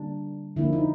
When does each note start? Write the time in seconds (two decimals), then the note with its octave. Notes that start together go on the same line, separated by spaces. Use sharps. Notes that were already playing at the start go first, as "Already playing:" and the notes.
Already playing: D3 G3 A#3 D4
0.56 D3 F3 A#3 E4
0.73 D#4